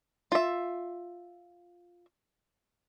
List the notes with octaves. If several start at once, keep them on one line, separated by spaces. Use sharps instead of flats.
F4 E5